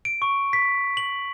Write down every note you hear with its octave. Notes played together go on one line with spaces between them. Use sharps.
D7
C#6
B6
F#7